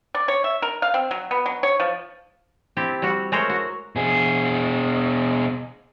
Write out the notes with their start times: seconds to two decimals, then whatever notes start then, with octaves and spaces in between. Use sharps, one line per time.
0.15 D5
0.28 C#5
0.44 E5
0.62 A#4
0.82 F5
0.94 C4
1.11 F#3
1.31 B3
1.46 F#3
1.63 C#5
1.80 F3
2.77 C4 E4 G4 A5
3.02 G3 F#4
3.32 G#3 A3 F#4 A#4 C5 C#5
3.49 F#4
3.96 B2 G#4